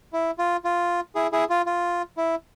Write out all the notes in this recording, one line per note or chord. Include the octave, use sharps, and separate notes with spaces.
E4
F4
F4
E4 G#4
E4 G#4
F4
F4
E4